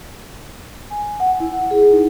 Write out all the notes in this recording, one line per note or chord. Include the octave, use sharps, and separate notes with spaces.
G#5
F#5
E4
G#4
D#4